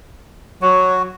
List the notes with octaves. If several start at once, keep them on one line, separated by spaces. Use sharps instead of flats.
F#3 F#4